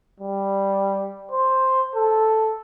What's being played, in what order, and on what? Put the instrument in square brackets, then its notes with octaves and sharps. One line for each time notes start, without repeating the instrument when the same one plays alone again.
[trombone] G3
C5
A4